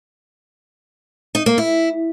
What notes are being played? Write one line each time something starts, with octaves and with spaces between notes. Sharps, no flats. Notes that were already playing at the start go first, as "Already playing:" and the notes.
D#4
A#3
E4